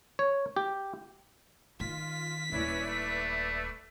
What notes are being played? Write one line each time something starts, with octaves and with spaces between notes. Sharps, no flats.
C#5
G4
D#3 F4 B6
D#1 C#4 E4 B4 D5 E5
A3